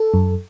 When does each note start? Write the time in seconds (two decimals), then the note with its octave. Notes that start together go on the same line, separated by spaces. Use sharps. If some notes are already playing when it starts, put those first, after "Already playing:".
Already playing: A4
0.14 F#2